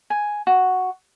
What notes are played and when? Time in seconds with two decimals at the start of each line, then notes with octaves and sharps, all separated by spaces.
0.10 G#5
0.47 F#4